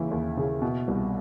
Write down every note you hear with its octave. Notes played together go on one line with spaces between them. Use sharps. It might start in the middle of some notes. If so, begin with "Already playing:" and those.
Already playing: D#2 C#3 E3 E4
D#2
C#3
B2
C2